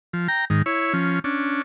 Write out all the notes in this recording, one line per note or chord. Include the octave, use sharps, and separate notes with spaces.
F3
G5 A#5
G#2 D#3
E4 C#5
F3 C#4
C#4 D4